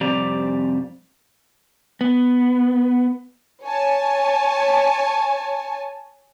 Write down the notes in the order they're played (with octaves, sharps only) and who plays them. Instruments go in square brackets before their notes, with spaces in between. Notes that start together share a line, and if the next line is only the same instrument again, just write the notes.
[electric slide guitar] F2 C3 G3 C4 D5 A#5
B3
[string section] C#5 G#5 A5